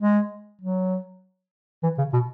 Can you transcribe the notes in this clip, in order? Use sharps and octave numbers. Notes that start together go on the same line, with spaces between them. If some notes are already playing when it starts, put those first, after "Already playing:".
G#3
F#3
E3
C#3
B2